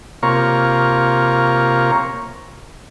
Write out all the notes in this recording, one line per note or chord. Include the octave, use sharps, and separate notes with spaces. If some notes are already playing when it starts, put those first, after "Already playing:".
C3 A#3 F4 A#4 C#5 C#6